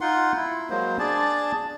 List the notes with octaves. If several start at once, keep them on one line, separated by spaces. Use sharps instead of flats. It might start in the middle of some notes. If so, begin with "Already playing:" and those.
D#4 F4 F#5 C6
E4
F#3 G#3 A#3 C5
D4 G#4 D5 A5